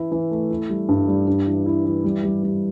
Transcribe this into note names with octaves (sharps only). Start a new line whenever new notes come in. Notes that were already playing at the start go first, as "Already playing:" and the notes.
Already playing: E3 E4
E3
A3
E4
G3
G2
G3
G2
E3
E4
E3
G3
G3
G3